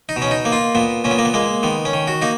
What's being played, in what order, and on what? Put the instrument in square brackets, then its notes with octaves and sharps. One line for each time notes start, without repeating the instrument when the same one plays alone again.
[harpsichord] D#4
B2
C#4
D#4
A#3
F4
A#2 B3
A#2 C#4
B3
A#3
B3
G#3 A#3
D#3 B3
C#4
D#3
F#4
A#3 D#4